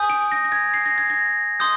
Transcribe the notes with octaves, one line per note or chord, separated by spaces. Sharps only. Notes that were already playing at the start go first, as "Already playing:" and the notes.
Already playing: G#5 D#6 G6
D7
A#6
A#6
G#6
C7
A#6
G#6
A#6
C6 D#6 G6